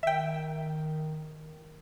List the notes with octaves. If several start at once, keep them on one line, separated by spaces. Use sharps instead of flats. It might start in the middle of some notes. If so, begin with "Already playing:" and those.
D#3 E5 G5